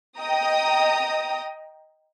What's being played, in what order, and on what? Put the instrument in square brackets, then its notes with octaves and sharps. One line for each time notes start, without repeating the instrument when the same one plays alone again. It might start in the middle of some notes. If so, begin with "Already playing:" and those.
[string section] D#5 G5 A#5 D#6